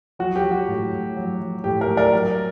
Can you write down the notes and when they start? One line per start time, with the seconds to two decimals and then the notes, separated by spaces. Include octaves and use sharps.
0.19 F#3 F#4
0.36 G4
0.43 F#3
0.51 F#4
0.68 A2
0.92 A2
1.17 F#3
1.40 F#3
1.64 A2 G4
1.80 G4 A#4
1.88 A2
1.97 A#4 D5
2.13 F#3